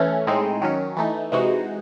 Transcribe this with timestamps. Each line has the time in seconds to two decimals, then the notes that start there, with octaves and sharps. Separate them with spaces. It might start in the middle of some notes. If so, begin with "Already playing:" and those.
Already playing: E3 A3 C#4
0.27 A2 G#3 C4 D#4
0.62 D#3 F#3 C#4
0.97 E3 A3 D#4
1.32 C3 E3 G#3 D#4 F#4